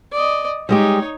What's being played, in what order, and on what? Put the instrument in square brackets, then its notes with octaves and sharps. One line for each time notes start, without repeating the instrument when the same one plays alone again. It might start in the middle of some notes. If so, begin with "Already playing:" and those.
[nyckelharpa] D5 D#5
[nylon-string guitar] G3 G#3 G4 [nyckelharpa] D#4 C#5